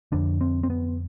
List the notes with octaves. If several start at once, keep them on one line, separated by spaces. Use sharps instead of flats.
F2 D3 D4
C4
C4
B3